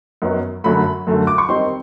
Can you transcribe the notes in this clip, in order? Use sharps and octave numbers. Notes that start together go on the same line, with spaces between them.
F#2 D#3 F#3 B3
F#2 D3 F#3 A3 B5
F#2 D3 F#3 A3
D6
C#6
D#3 G3 C4 D#4 C6